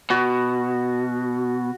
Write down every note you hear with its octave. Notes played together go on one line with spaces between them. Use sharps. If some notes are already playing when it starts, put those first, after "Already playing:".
B2 F#4